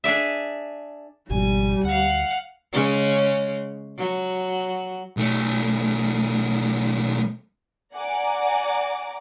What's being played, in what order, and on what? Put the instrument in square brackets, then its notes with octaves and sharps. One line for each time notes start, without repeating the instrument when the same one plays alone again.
[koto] D4 G#4 D5 E5
[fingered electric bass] G#1 F2 B2 [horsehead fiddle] G3 [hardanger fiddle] G#5
[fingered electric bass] D2 [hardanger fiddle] F5 F#5
[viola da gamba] C#3 G#3 C#4
F#3 F#4
[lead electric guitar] B1 A3
[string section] D5 F#5 G#5 A#5 D6